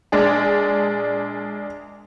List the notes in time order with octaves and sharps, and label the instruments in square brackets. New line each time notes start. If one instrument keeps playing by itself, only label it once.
[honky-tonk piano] A#1 G#3 D4 G#4